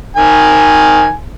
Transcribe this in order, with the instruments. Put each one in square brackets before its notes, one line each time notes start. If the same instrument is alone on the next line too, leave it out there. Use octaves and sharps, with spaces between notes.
[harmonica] D#3 G#5